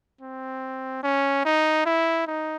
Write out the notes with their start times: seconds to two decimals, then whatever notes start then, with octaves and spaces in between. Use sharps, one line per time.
0.21 C4
1.03 C#4
1.45 D#4
1.86 E4
2.27 D#4